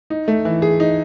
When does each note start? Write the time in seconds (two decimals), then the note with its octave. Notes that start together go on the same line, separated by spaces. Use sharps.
0.10 D#4
0.28 A3
0.45 E3
0.62 G#4
0.80 D#4